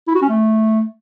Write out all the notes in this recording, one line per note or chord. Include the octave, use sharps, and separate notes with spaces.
E4
F#4
C#4
A3